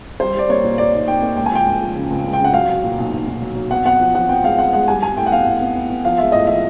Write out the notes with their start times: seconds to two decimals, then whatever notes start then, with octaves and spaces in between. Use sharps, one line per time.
0.20 G3 C5
0.35 G3 D5
0.49 A#3 C#5
0.64 A#2
0.78 A#3 D5
0.93 D#4
1.08 D#4 G5
1.22 A#3
1.36 C#2 G5
1.46 G#5
1.52 F3 G5
1.66 C#2
1.81 F3
1.96 C#3
2.10 C#2
2.25 C#2
2.33 G5
2.40 C#3 F#5
2.54 F#3 F5
2.69 F#3
2.84 A#2
2.98 B1
3.12 B1
3.27 B1
3.42 F#3
3.56 F#3
3.71 B3 F#5
3.85 B3 F#5
4.00 F3
4.15 F3 F#5
4.29 B3 G5
4.44 G#3 F5
4.58 B3 F#5
4.73 G#3 F#5
4.88 G3 G#5
5.03 G3 G#5
5.17 A2 G5
5.26 F#5
5.32 B3 F5
5.46 A2
5.60 B3
5.75 B3
5.90 B3
6.05 F3 F5
6.18 G#3 E5
6.32 A2 D#5
6.47 F3 E5